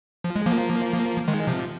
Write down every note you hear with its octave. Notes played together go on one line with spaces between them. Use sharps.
F3
G#3
F3 A#3
D#3 G#3
C3 F3